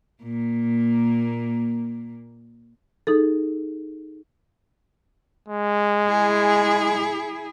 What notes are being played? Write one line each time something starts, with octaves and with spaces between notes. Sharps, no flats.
A#2 A#3
D#4 G#4 A4
G#3
E4 G#4